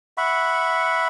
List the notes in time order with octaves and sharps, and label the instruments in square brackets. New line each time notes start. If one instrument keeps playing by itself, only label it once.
[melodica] E5 F#5 B5 C#6